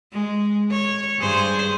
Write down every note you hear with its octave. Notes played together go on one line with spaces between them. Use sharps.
G#3
C#5
G2 G#4 C5